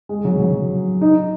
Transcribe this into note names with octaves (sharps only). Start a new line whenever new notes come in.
G#3
F#3
F#3
D#4